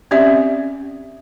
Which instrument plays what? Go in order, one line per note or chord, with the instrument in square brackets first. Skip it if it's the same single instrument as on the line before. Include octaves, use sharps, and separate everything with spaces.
[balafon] C4 C#4 G4 D5 E5